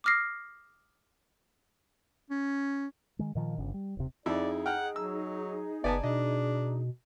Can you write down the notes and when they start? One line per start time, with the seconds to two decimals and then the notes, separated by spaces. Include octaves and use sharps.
0.04 D6 D#6 F6 A#6 C7
2.30 C#4
3.19 D#3 G#3
3.35 A#2 D#3 F3
3.58 G1 C#3
3.74 G3
3.97 D#1 C3
4.26 F2 D#4 E4 G#4 D5 E6
4.66 F#5 G5 F6
4.96 F#3 E6
5.84 F#1 B3 D5 G#5 A5
6.04 B2 D4 D#5